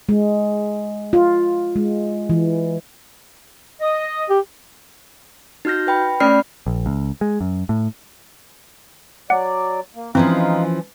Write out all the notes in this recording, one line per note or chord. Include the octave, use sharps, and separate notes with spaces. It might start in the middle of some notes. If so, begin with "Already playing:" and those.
G#3
F4
G#3
E3
D#5
G4
D#4 F#4 F6 G6 A#6
B4 G5 B5
A3 C#4 D5 B5 F6 C7
A#1
C#2
G#3
F#2
A2
F#3 D5 F#5
A#3
E3 F3 G#3 C4 C#4 D#4 F5